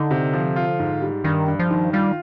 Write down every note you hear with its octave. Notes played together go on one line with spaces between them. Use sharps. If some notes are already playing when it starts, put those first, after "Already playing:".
Already playing: D3 D#4
C3
F3
F4
G#2
G3
G2 D#3
G2
F3
D#3
G3 F4